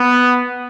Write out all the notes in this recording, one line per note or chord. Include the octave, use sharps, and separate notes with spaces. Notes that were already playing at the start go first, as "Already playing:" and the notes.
Already playing: B3